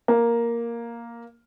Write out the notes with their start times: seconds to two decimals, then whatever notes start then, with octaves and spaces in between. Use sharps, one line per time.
0.08 A#3